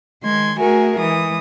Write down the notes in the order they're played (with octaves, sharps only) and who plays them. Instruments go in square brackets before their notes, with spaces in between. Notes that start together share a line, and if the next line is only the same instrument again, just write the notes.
[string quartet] D#3 G#3 C6 G#6
A3 F#4 G#4 A#4 E5 G#5
E3 G#3 D#6